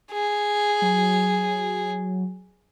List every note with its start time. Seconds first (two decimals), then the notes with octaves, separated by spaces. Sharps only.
0.12 G#4
0.82 F#3